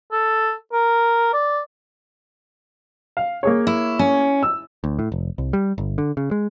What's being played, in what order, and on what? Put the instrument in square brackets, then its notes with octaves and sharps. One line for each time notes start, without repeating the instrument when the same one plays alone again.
[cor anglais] A4
A#4
D5
[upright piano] F5
A#3 G#4 C#5
[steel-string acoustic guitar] E4
C#4
[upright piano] E6
[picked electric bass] D2
A2
F1
C2
G3
G1
D3
C#3
G#3